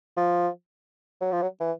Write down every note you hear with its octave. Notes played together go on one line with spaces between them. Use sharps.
F3
F#3
F3
F#3
E3